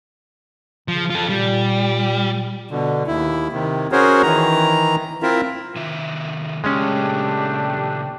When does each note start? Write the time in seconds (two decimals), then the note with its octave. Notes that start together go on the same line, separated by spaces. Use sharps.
0.88 C#3 F3
1.10 F4 A4
1.29 A#2 G3
2.71 B2 D3
3.07 D#2 E4
3.53 C3 D#3
3.92 C#4 F#4 G#4 A#4 C5 C#5
4.22 D#3 E3 A#5
5.23 C4 E4 F4 A#4 E5
5.76 C3 D#3 E5
6.64 A#2 C#3 G#3 A3 C#4 D4 G4 C#5